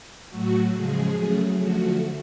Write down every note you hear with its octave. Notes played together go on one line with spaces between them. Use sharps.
A2 F#3 A3 F#4
C#3 F3 G#3 G#4
C#3 F#3 A3
D3 F3 A3 F#4